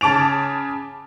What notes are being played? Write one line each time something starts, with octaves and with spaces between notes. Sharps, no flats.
C#3 A5 D6 D7 F7